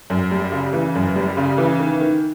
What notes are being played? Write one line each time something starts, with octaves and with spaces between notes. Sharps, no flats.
F#2
G3
C#3
E3
F#2
G3
C#3
E3
D#3
D#3